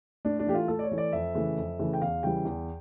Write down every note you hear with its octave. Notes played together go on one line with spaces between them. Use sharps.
A2 D4
D4
E3 A3 G4
F4
A2 A4
D5
C#5
E3 A3
D5
F2 E5
C#3 E3 A3
F2
C#3 E3 A3
G5
E2 F5
C#3 E3 G3 G5
E2